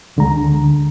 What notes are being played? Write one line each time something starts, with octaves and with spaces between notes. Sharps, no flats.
D2 D3 G#3 A#5